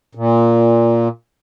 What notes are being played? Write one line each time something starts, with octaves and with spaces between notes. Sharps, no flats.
A#2